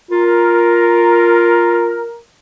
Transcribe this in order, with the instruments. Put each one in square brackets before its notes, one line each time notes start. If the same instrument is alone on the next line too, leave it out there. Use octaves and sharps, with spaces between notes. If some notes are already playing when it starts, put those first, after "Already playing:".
[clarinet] F4 [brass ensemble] A#4